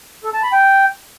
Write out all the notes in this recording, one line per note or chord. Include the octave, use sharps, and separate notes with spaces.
A4
A5
B5
G5